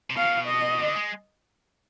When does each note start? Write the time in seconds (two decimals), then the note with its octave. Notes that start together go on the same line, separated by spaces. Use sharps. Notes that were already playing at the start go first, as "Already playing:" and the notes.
0.10 C3
0.16 B2 F5
0.47 D#5
0.79 D3
0.95 G#3